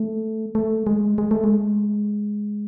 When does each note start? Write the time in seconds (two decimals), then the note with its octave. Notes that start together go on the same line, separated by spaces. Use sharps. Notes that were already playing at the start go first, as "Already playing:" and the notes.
Already playing: A3
0.55 A3
0.87 G#3
1.18 G#3
1.31 A3
1.44 G#3